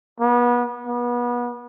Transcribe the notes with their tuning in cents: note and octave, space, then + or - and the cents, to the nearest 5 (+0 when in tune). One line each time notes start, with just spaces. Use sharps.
B3 -30
B3 -30